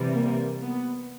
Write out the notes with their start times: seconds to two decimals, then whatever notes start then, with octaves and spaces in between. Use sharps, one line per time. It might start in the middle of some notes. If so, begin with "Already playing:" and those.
Already playing: C3 E3 G3
0.14 A#3
0.62 B3